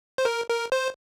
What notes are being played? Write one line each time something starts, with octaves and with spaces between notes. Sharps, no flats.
C5
A#4
A#4
C5